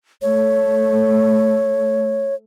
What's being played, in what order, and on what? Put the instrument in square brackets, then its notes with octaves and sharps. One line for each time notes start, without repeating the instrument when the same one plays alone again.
[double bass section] A3 [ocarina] C#5